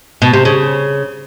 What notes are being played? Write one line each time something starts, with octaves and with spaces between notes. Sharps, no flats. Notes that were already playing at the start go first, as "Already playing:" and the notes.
B2
C3
C#3